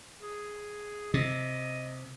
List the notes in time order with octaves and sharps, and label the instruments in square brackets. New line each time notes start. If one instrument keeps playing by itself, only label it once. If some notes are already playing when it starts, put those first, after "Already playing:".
[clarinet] G#4
[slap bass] C3 [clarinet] D#5